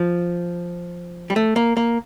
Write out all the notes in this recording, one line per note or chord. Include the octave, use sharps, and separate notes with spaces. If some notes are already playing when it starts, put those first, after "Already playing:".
Already playing: F3
G3
A3
A#3
A#3